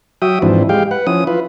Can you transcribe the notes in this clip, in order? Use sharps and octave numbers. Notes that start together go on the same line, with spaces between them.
F#3 F#4 E5 G5 D#6
G#2 E3 F3 C4 D4 E4
G#3 G4 F5 G5
B4 F#5
F3 C#4 E4 D#6
E4 F4 B4